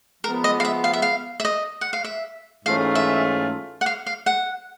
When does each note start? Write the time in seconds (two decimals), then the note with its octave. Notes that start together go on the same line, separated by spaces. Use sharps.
0.23 F3 G#3 B3 A#4
0.44 D#5
0.60 F5
0.65 E5
0.84 F5
0.93 E5
1.02 F5
1.40 E5
1.45 D#5
1.81 F#5
1.93 F5
2.04 E5
2.65 G#2 E3 A3 C#4 F4 F5
2.95 E5
3.81 F#5
3.86 F5
4.07 F5
4.26 F#5